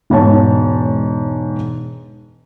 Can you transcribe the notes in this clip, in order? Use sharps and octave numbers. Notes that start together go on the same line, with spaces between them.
E1 G#2 C#5 A5